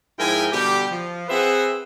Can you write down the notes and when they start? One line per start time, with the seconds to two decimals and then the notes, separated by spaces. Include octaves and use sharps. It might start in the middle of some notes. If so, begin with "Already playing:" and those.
0.18 G#2 F3 E4 A#4 G5 G#5
0.52 B2 D3 G3 G4
0.91 F3
1.29 C4 G#4 B4 C5 E5 F#5